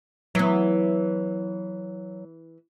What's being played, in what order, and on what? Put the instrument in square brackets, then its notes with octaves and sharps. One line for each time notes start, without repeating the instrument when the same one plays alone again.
[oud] E3 B3 [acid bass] F#3